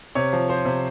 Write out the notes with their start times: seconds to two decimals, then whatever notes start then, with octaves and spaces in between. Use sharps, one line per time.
0.15 C3 C#5
0.33 F3
0.49 F3 C5
0.65 C3